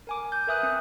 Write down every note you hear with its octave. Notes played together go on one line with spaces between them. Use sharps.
A#4 G#5 D6
G6
A#4 B4 E5 G#5 D#6 F#6
C4